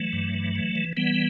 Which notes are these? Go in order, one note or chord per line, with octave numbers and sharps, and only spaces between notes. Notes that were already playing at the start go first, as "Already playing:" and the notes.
Already playing: E3 F#3 A3
G2
E3
E3
E3
E3 G3 B3